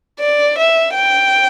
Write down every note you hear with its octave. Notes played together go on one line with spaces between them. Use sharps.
D5
E5
G5